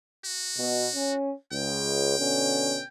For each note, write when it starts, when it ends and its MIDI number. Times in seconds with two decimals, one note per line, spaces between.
0.25 1.15 66
0.59 0.88 47
0.96 1.32 61
1.52 2.14 37
1.52 2.88 79
2.19 2.81 47
2.19 2.81 50
2.19 2.81 61